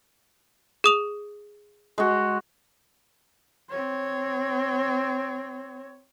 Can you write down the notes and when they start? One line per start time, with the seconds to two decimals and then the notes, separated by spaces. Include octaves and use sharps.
0.84 G#4 D#6 F7
1.98 G#3 F#4
3.70 C4 C#5